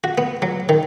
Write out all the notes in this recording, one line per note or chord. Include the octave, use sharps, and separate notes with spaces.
F#4
B3
F#3
D#3